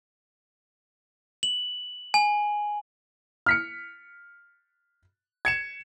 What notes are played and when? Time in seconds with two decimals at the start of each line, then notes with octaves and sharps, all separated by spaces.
1.43 F#7
2.14 G#5
3.46 F6 B6 C#7
5.45 G#6 C#7 E7